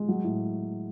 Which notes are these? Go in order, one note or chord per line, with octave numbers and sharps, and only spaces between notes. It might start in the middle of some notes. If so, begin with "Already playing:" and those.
Already playing: G#3
F#3
A2